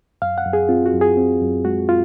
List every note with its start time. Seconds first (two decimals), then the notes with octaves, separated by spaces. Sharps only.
0.22 F#2 F5
0.38 F#5
0.45 F#2
0.53 G#4
0.69 C4 F4
0.86 F#4
0.93 F#2
1.01 G#4
1.17 C4
1.42 F#2
1.65 G#3 F#4
1.89 F4